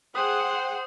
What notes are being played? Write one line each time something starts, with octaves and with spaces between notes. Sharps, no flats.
G#4 C5 F#5 G5 D#6